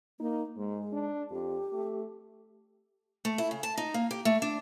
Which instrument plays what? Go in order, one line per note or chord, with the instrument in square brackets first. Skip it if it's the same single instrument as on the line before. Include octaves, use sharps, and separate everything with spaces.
[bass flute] A#3 [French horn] D#4
[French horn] G#2 [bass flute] G#3
[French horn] D4
[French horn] F2 [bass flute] G4
[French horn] A3
[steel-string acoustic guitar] A3
E4
C#3
A5
D#4
A#3
G4
A3
D4